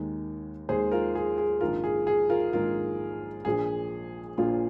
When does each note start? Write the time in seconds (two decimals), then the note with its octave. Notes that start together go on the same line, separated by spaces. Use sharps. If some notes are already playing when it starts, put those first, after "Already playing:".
Already playing: D#2 D#3 G#3
0.69 D#2 D#3 G#3 G#4 C5
0.92 F4 A#4
1.15 G#4
1.38 G#4
1.61 A#1 G#2 D#3 G#3 F4 A#4
1.84 G#4
2.07 G#4
2.30 F4 A#4
2.53 A#1 G#2 D#3 G#3 F4 A#4
3.45 A#1 A#2 F3 G#4
4.38 A#1 A#2 F3 F4